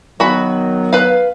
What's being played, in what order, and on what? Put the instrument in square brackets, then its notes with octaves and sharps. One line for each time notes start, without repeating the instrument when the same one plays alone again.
[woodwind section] D#3 F#3 B3 [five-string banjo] F#4 B5
[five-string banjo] B4 F5